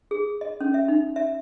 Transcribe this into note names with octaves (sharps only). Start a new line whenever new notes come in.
G#4
D#5
C#4
E5
D#4
E5